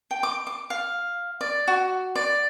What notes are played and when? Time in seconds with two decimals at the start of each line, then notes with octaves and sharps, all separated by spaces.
0.11 G5
0.23 D6
0.47 D6
0.70 F5
1.41 D5
1.68 F#4
2.15 D5